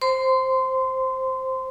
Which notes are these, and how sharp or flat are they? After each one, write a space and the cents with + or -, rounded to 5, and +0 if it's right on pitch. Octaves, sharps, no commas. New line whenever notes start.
C5 +5 C6 -20